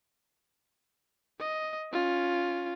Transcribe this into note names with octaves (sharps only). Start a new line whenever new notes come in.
D#5
C#4 F4